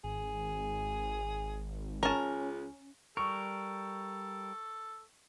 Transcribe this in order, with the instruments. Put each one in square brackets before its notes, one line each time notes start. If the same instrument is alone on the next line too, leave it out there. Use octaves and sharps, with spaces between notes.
[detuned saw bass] G#1 [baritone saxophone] G#4
[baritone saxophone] C#2 [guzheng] C#4 [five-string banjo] A#4 A5
[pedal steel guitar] G3 A#4 [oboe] A4 [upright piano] C#6